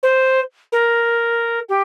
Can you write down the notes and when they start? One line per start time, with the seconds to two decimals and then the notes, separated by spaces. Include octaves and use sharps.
0.03 C5
0.72 A#4
1.69 G4